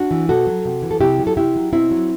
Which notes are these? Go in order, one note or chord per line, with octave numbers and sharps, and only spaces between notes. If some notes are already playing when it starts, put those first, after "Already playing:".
Already playing: D4 F#4
E3
B2 F#4 A4
F#3
C3
E3
A4
C3 E4 G4
F#3
A4
C3 E4 G4
F#3
B2 C4 E4
F#3